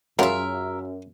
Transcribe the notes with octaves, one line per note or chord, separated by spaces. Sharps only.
F#2 C#3 F#3 E4 F4 A#4 E5